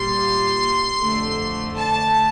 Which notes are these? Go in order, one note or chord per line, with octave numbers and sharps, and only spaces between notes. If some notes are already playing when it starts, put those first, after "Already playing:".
Already playing: A#2 G3 C6
F2 D3 A3
A5